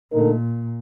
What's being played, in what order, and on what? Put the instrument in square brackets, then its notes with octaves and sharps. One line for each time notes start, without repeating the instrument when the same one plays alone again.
[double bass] A#2 [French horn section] D3 A3 D#4 A#4